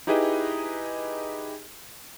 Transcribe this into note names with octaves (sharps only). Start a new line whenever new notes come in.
D#4 E4 G4 G#4 B4 D#5